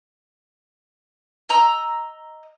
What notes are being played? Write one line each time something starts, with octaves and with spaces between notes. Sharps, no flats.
D#5 A#5 E6